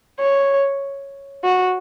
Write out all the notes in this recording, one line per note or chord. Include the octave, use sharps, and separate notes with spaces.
C#5
F#4